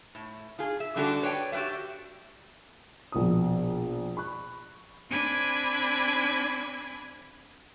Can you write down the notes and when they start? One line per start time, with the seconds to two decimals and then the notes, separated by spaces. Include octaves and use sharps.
0.15 A2
0.59 F4 G#4
0.80 E5
0.96 D3 G3 A3 D4 F#4 A4
1.23 B4 C#5 D5 F#5 G5
1.52 F#4 G4 B4 D5 E5
3.12 A#1 B2 D#6
4.17 B5 C#6 F#6
5.10 C4 D4 G#5 B5 G#6